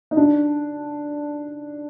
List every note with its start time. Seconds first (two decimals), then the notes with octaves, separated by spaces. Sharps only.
0.11 D#4
0.17 D4